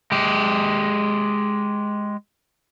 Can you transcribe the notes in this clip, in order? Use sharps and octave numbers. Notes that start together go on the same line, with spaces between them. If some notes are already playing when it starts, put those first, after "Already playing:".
G#3 G4